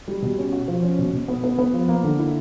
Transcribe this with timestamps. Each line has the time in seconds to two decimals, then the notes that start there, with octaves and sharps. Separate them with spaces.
0.08 G3
0.22 B2
0.38 C#4
0.53 F#4
0.68 F3
0.83 C#4
0.99 B2
1.13 B2
1.28 B3
1.44 B3
1.59 B3
1.74 F3
1.88 A#3
2.03 D3
2.19 E4